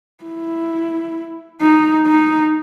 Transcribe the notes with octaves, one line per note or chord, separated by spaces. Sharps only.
E4
D#4
D#4